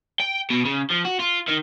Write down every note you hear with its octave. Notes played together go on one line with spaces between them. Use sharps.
G5
B2
C#3
F3
F#4
F4
D#3